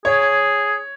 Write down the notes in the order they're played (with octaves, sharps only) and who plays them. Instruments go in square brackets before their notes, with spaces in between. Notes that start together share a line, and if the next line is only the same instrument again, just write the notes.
[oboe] G#4 [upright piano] C#5